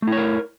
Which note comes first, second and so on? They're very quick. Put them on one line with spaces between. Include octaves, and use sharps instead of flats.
A3 E4 C#5 A#4